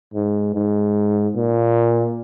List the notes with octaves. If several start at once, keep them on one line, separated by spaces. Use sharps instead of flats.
G#2
G#2
A#2